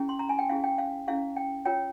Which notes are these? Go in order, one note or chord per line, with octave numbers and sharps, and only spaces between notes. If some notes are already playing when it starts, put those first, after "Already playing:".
Already playing: C#4 E4 G#4 G5
C6
A#5
G#5
G5
C#4 E4 G#4 F5
G5
F5
C#4 E4 G#4 F5
G5
F4 A#4 C#5 G5